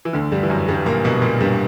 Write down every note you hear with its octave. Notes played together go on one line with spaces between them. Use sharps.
E3
D2 D3
G2 G3
E3
F#2 F#3
G2 G3
A#2 A#3
B2 B3
A#2 A#3
G2 G3